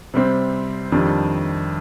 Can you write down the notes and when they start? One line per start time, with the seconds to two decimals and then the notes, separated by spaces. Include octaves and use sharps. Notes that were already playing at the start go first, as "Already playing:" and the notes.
0.14 C3 G3 C4
0.92 F2 D#3 G3 D4